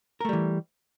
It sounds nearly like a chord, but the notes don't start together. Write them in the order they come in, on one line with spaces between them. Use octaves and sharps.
A#4 A3 G3 E3